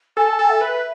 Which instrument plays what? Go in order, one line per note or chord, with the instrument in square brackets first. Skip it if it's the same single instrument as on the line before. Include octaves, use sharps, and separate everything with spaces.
[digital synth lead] A4 [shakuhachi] G#5
[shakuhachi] A5
[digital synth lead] A4 [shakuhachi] G#5
[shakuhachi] E5
[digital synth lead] B4